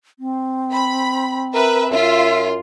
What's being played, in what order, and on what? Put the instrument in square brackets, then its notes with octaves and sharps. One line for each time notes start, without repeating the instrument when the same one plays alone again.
[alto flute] C4
[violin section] B5
[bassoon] A#4 [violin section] B4 E5
[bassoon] F#2 [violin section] F4 [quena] E5